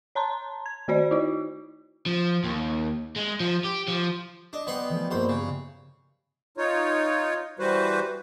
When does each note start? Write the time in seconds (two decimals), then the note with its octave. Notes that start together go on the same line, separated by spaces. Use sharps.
0.15 C#5 A5 A#5 C6
0.66 G#6
0.88 D#3 A3 F#4 C5 D5
1.11 D#4 E4 F#4
2.06 F3
2.44 D#2
3.16 G#3
3.40 F3
3.64 G4
3.88 F3
4.53 D4 D5 D#5
4.67 F#3 B3 F#5 G5 C6
4.89 E3 F3 A3
5.11 A#1 G2 B3 C5 A#5
5.29 C#3
6.58 D#4 F4 C#5
7.59 E3 G3 F#4 B4 C5